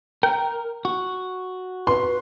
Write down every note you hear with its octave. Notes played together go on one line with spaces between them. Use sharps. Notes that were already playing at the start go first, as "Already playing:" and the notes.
A#4 G5
F#4
B4 C6